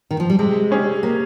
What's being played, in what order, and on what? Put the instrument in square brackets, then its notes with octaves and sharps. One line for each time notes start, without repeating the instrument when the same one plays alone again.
[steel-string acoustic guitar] D#3
F3
G3
[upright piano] C3 [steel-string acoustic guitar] G#3
[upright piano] G3 C#4 G#4
[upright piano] C3 [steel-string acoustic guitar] A#3